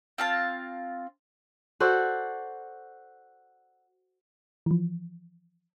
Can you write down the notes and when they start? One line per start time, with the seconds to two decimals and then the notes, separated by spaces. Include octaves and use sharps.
0.18 C4 F4 A5
1.80 F#4 A4 C5 D5
4.66 E3 F3